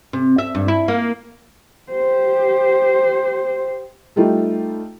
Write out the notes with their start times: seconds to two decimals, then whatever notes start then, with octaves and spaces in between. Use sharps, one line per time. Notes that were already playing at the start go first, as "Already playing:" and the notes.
0.13 C3
0.38 E5
0.55 G2
0.68 E4
0.88 A#3
1.91 G4 C5
4.16 G3 A3 D#4 F4 G4 A4